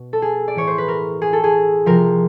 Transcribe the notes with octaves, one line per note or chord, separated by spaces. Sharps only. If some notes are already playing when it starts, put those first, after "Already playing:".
Already playing: B2
A4
G#4
D5
A2 E3 C#5
C5
B4
A#4
G#4
A4
G#4
C3 F3 A#4